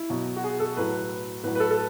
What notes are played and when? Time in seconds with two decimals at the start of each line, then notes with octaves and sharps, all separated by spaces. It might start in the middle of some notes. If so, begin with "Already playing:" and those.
Already playing: E4
0.10 B2 F#3
0.36 F#4
0.44 G#4
0.60 A4
0.77 A2 F#3 B4
1.44 A2 F#3 B4
1.55 B4
1.60 A4
1.71 A4